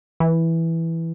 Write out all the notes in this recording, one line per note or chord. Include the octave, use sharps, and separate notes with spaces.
E3